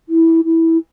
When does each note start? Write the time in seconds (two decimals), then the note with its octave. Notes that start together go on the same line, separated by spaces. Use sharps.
0.09 E4
0.45 E4